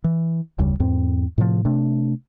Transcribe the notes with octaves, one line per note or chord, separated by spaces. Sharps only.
E3
F1 D2 C#3 G3
E2 G#2 C4
A2 C3 E3 F3
C3 A3 D4